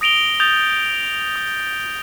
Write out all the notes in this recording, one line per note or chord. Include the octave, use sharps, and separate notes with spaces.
D#6 A#6 D7 F7 G7
D#6 G6 A6 F7
D#6